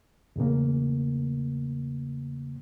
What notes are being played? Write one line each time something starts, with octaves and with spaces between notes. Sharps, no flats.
E2 A2 C#3 A#3